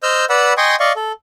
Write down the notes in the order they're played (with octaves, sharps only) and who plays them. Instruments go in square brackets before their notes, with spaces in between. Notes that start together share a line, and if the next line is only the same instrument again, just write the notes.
[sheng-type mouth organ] C5 D#5 E6 F6 G6
B4 D5 F#5 B5 E6
D#5 G5 G#5 C6 C#6 D#6
D5 D#5 F5 C#6
A4